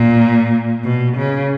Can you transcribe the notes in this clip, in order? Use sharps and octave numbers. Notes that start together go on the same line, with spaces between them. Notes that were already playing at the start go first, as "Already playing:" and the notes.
Already playing: A#2
B2
C#3